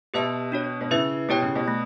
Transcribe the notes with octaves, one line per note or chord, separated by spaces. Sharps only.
B2 G4 B4 E5 A5
D4 F#4 C#5
B2
C#3 E4 B4 E5
B2 E4 G4 C#5 G5
C#3
B2
A3